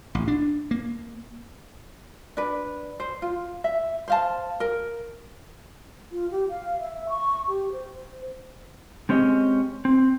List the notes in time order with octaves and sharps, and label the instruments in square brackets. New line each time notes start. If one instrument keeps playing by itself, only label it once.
[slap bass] A1
D4
A#3
[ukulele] D4 B4
C5
F4
E5
C5 F5 A5
A#4
[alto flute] F4
G4
F5
E5
C#6
G4
C5
[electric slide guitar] G#3 C4 C#4 G4 D#5
C4